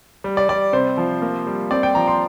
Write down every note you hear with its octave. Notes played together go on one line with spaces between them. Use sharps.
G3
D5
G3 D5
C3 C5
F3
A#3
G3
C4 D5
G5
F3 A#5
C6